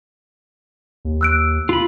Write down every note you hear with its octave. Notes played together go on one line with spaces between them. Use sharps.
D#2
E6 F#6 D7
F4 B5